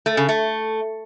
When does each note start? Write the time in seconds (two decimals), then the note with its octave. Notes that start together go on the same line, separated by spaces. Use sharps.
0.06 A3
0.17 C#3
0.29 A3